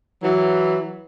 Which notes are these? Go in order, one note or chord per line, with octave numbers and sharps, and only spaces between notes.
E3 F#3